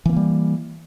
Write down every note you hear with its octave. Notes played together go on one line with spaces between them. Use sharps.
E3 G3 A#3 B3